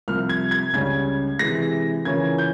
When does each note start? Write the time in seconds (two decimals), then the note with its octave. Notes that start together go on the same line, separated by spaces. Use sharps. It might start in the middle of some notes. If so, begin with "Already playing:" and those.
0.08 C2 C3 F3 F6
0.29 G#6
0.51 G#6
0.74 C#2 C#3 G3 C#4 G#6
1.39 C3 E3 G#3 A#6
2.05 C#3 E3 A#3 C#4 F4 G#6
2.38 G6